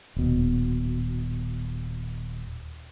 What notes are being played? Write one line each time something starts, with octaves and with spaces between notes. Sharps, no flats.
D#1 B2